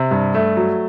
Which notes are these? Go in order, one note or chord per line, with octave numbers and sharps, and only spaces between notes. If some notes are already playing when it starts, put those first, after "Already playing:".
Already playing: C3
G2
A3
F#3